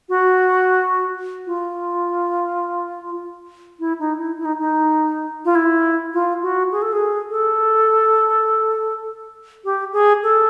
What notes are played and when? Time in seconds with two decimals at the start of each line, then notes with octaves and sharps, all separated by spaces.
0.09 F#4
1.47 F4
3.80 E4
3.99 D#4
4.19 E4
4.38 E4
4.45 D#4
4.59 D#4
5.45 F4
5.55 E4
6.14 F4
6.43 F#4
6.72 G#4
6.82 A4
6.92 G#4
7.30 A4
9.65 G4
9.93 G#4
10.23 A4